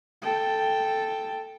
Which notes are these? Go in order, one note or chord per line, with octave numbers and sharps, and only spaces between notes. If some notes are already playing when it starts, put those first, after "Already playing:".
A4 G5